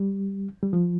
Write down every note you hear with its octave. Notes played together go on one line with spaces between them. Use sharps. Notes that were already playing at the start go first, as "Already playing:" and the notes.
Already playing: G3
G3
F3